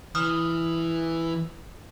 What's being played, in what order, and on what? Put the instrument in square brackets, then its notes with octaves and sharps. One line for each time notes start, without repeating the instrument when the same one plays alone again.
[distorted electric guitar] E3 [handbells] D#6 F6